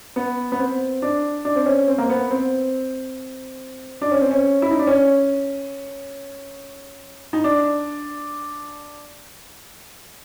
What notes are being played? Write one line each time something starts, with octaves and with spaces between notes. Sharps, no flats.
B3
B3
C4
D4
D4
C4
C#4
C4
A#3
B3
C4
D4
C#4
C4
C#4
E4
D#4
D4
C#4
D#4
D4